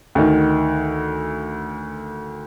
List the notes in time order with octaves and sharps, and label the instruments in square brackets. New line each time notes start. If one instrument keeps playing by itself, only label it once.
[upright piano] D2 D#3